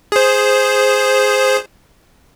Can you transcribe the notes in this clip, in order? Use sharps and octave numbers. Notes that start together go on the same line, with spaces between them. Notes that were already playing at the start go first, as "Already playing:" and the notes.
G#4 C5